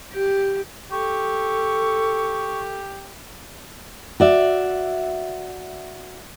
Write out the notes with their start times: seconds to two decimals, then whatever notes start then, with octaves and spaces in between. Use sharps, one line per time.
0.14 G4
0.91 G4 A4 C#6
4.20 F#4 D5 E5